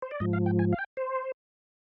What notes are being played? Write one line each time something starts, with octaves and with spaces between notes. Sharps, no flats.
C5
D5
G#2 F3 D#5
F5
G5
G#5
F5
G5
C5